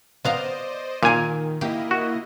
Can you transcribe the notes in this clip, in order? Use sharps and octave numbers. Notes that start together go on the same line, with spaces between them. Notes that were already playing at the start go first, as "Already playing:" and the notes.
B3 C5 D5 D#5 F5 A#5
A#2 D#3 A#4 F5 G#5
A#3 E4 G4 D#5
F#4